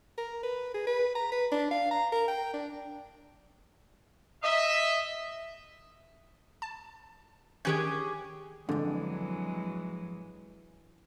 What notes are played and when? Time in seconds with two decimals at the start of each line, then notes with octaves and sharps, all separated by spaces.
0.18 A#4
0.43 B4
0.74 G#4
0.87 B4
1.15 A#5
1.32 B4
1.52 D4
1.71 F5
1.91 A#5
2.13 A#4
2.28 G5
2.54 D4
4.43 D#5 E5
6.62 A5
7.65 D#3 C#4 G4 G#4 F#6
8.69 F2 G#2 D3 E3 F#3 G#3